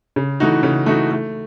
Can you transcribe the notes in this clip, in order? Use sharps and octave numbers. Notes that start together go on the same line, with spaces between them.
C#3
E3 A3 D#4 F#4
C#3
E3 A3 D#4 F#4
A3